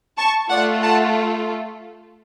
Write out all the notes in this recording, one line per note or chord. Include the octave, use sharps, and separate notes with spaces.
A5 C#6
A3 F4 A4 D5 F#5
F#5 A5